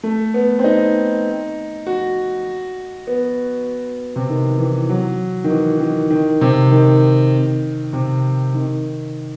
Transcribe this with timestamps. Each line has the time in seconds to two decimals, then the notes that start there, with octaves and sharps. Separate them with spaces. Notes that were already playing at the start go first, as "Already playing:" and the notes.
0.04 A3
0.34 B3
0.59 C4
0.64 D#4
1.87 F#4
3.07 B3
4.16 C3
4.29 D#3
4.59 E3
4.89 F#3
5.44 D#3
5.50 E3
5.80 D#3
6.10 D#3
6.41 C3
6.72 D#3
7.93 C3
8.54 D#3